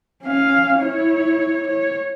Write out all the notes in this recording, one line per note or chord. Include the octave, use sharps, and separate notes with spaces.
C#4 F5
E4 C#5
C#5